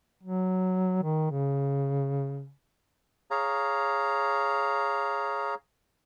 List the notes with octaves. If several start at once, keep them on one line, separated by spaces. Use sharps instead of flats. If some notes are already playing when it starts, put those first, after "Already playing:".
F#3
D#3
C#3
G#4 C#5 F5 A#5